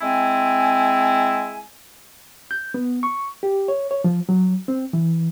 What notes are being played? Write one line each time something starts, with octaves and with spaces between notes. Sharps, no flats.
G#3 C4 E4 G#5
G6
B3
C#6
G4
C#5
C#5
F3
F#3
C4
E3